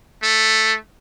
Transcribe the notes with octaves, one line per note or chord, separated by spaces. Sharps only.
A3